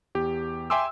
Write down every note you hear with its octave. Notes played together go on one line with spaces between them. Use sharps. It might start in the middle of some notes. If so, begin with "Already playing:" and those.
E2 G4
E5 G5 G#5 C6 D6 E6